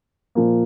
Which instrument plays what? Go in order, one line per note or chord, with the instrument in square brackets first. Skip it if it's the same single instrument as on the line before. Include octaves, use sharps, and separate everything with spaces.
[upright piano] A#2 F3 A#3